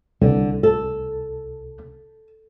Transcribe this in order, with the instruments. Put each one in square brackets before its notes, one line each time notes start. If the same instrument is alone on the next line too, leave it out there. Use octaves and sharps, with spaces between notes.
[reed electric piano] C2 [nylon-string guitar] D3
[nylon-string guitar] A4